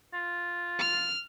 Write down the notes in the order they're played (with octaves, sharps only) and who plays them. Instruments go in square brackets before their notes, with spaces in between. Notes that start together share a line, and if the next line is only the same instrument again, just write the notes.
[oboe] F4
[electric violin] F6